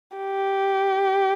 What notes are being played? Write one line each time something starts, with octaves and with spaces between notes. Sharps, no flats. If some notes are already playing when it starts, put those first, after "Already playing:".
G4